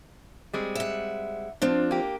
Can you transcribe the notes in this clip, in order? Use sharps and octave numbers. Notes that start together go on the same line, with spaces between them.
G3 G#3 C4
E5 F#5
F3 C4 D4 F4
A#3 G4